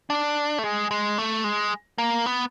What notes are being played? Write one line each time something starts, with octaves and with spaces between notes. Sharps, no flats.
D4
A3
G#3
G#3
A3
G#3
A#3
B3